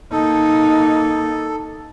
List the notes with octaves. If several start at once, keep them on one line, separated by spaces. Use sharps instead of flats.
A#3 D#4 A4